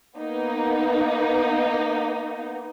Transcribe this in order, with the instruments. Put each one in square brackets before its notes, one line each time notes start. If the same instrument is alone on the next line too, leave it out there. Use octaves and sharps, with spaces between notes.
[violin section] A#3 B3 D#4